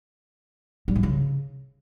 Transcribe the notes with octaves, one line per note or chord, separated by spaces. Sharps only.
G3
G#2
C#3